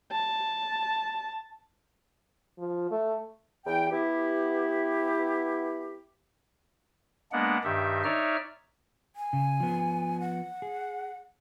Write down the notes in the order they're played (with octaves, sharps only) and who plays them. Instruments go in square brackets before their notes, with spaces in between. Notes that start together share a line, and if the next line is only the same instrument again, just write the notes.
[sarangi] A5
[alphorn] F3
A3
[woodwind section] E2 G5
B3 E4 G4
[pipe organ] G#3 A#3 B3 D4 F#5
G2 D#3 G4 E5
D#4 C#5 D5 E5 F6
[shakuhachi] G#5
[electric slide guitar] C#3
F3 B3
[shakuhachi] F#5
[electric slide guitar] G#4